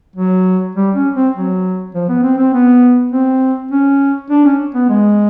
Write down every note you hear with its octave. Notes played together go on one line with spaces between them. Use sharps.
F#3
G3
C#4
C4
F#3
F3
B3
C4
C4
B3
C4
C#4
D4
C#4
B3
G#3